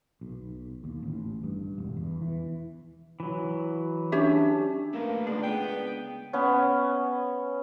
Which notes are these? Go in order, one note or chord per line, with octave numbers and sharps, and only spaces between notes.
B1
D#2
A1
G2
E1
E2
E3
E3 F#3
C#4 D4 G4 E5
A3 A#3 B4
C#2 G#3 D4 D5
B3 G5
B3 C#4